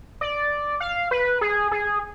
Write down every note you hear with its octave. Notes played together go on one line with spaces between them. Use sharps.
D5
F5
B4
G#4
G#4